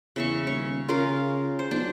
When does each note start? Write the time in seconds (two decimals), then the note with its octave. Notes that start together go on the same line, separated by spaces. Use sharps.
0.16 E2 C#3 E5 C#6
0.47 D#1 C#5
0.88 C#3 F4 A#4 F5
1.59 C5
1.71 B1 D4